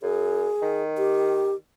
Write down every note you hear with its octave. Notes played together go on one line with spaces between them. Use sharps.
F#2 G#4
D#3
G4